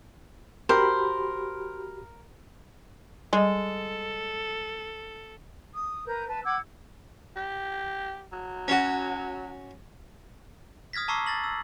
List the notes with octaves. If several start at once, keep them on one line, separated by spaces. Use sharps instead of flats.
F#4 G4 A#4 C5 B5
G3 G#3 A4 D#5
D#6
A#4 B4 G6
B4 A5
F#5 D6 E6 G#6
G4
F#3
C#4 F#4
D#6 F6 G#6 A#6 B6
A5 A#5 C#6 D6 E6 C7
A6 A#6 F#7
E6